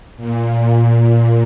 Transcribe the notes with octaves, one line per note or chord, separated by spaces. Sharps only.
A#2